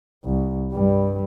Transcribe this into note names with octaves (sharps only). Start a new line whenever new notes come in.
C2
G2 G3